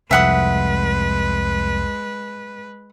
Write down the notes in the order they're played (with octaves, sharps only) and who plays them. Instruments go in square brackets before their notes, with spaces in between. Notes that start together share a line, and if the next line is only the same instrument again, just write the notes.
[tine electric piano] C2 F2 [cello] G#3 B4 [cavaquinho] E5 F#5 D#6